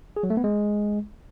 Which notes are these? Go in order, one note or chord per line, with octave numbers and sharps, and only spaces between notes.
G#4
F#3
A3
B3
G#3